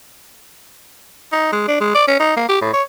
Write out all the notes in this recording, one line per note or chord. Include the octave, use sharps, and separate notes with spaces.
D#4
G#3
D4
G#3
D5
C#4
D#4
A#3
G4
A2
C#5